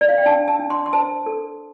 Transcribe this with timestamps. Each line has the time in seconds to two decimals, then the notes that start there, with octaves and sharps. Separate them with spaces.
0.01 D5
0.09 F5
0.18 G5
0.26 D4 A5
0.48 A5
0.59 D4
0.70 C6
0.86 C6
0.93 C5 A5
1.26 A4